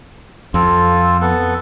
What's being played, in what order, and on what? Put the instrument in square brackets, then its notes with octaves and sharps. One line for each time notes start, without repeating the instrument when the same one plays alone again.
[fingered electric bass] F2 [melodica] C4 F4 A4
[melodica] B3 A4